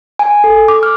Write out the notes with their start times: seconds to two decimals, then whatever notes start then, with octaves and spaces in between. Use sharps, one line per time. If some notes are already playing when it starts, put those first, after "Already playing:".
0.19 G#5
0.44 A4
0.68 D6
0.83 F6